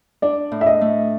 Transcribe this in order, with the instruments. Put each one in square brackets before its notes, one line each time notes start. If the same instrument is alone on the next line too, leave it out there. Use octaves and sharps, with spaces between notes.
[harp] D4 [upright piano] D5
[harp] A2
[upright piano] E5
D#5
[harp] A3